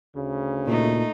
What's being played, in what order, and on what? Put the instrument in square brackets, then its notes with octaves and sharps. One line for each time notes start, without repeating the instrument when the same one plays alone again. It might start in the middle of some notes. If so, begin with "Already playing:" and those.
[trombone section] D2 C#3
[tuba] A#2 [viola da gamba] A3 D#4